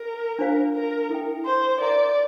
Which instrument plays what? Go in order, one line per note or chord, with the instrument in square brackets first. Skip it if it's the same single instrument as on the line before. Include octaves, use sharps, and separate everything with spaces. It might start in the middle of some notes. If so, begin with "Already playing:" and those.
Already playing: [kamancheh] A#4
[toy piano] D4 F4 C5 F5
[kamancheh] A#4
[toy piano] E4 A4 E5 G5
[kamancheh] C5
[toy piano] A#4 E5 A#5 [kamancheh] D5